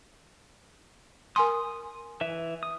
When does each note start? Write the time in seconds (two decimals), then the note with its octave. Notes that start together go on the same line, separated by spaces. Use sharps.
1.36 A#4 G#5 C6 D#6
2.21 E3 E5
2.63 D#6